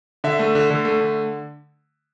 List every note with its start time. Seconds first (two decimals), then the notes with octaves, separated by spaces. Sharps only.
0.24 D3 E5
0.39 A3
0.55 D3
0.70 D3
0.85 A3
1.00 D3